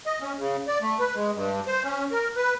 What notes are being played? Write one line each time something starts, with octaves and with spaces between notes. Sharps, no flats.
D#5
C#4
C#3
D5
A3
B4
G#3
G2
C5
C#4
A#4
B4